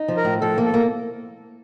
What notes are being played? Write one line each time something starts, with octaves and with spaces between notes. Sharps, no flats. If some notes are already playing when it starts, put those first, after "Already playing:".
Already playing: D#4
F3
A#4
A2
F3 A4
A#3
A4
A#3